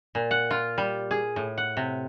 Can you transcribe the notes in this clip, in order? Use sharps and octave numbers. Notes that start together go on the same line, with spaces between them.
A#2
F#5
F4
G3
G#4
A2
F#5
C3